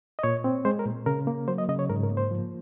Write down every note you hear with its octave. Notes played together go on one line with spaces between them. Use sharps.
D#5
A#2 C#5
C4
G#3 C5
A#4
A#2
C#3 A#4
A#3
F#3 C5
D#5
C#3 D#5
C#5
G#2 A#4
A#4
A#3
C5
F3